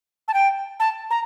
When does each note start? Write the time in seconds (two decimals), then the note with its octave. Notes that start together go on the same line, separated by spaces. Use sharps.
0.28 A5
0.34 G5
0.80 A5
1.10 A#5